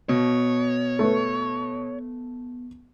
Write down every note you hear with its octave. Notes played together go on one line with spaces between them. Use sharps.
B2 B3 C#5
A3 B4